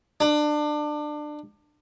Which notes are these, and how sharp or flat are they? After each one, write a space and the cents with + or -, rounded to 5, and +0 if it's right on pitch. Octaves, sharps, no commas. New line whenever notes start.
D4 +25